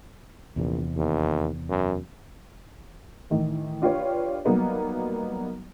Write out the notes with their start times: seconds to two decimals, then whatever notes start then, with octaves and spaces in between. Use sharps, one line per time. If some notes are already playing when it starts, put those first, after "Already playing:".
0.56 A#1 E2 C3
0.96 D#2
1.69 F#2
3.30 A2 D#3 E3
3.82 D4 F4 G4 B4 C#5
4.45 F#3 G3 A#3 B3 D#4